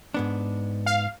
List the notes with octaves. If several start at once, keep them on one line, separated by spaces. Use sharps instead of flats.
G#2 B3 D4
F5